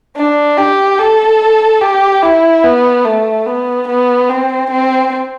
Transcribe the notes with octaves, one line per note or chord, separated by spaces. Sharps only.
D4
G4
A4
G4
E4
B3
A3
B3
B3
C4
C4